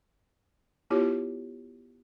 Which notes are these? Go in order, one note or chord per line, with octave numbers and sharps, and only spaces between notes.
B3 E4 F4 G4 C#5